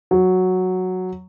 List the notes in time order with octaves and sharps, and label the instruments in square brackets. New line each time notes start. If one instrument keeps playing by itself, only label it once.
[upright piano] F#3